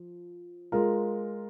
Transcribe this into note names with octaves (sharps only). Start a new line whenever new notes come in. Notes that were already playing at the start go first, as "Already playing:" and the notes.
Already playing: F3
G#3 F4 A#4